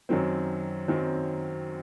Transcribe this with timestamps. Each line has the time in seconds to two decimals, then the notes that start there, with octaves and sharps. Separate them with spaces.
0.09 F#2 D#3 F#3 C4
0.88 F#2 D#3 F#3 C4